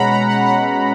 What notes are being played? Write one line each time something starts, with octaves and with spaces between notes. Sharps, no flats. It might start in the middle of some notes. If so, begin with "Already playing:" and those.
Already playing: B2 G#3 C#4 F#5 A#5 B5
A#5
F#5
F#5